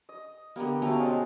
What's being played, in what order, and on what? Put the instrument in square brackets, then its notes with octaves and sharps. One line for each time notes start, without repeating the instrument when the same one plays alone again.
[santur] D#5
[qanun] D3 B3 [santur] A#3 G4 A#5
[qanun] B2 C#4 A#5 [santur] A3
[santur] G#3 F4 C5